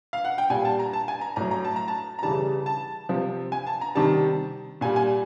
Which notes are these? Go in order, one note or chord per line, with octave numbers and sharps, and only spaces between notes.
F5
F#5
G5
A#2 G3 G#5
A5
A#5
A5
G#5
A#5
A2 F#3 A#5
A#5
A5
A#5
A5
A#5
C#3 E3 G3 A5
A5
C3 F3
G#5
A5
A#5
C3 D#3 G3 A5
A#2 G3 G#5
G#5